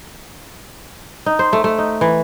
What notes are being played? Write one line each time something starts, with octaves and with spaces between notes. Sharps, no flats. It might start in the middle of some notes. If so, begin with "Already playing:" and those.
D#4
C5
A3
A3
D#4
E3